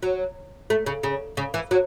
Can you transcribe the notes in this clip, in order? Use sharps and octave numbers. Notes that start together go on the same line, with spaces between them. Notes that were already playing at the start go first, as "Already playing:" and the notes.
F#3
A3
C#3
C#3
C#3
E3
F#3